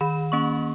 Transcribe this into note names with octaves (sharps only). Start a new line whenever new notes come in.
D#3 B5
A#3 C#4 C#6